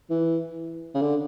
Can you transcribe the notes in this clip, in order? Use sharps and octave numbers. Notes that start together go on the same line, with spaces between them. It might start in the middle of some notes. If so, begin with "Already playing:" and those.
E3
C#3
D3